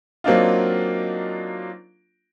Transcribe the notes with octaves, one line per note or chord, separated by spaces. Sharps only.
F#3 A#3 C4 D4 D#4 F4